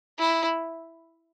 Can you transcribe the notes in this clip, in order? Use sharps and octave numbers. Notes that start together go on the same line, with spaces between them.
E4